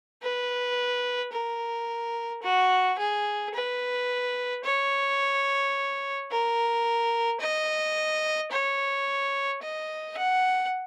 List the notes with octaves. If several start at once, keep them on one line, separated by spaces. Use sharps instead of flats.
B4
A#4
F#4
G#4
B4
C#5
A#4
D#5
C#5
D#5
F#5